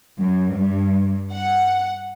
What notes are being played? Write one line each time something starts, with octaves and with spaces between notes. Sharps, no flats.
F#2
G2
F#5